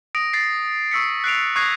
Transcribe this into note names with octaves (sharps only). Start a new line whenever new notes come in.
D#6 A#6 D7
A6 C7
C#6 E6 B6 C#7
F#6 C7 D7 F7
C#6 D#6 F#6 G#6 A#6 C7